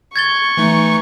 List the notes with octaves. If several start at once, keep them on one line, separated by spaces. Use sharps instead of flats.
C#6 G#6 A6 G7
E3 A3 D#4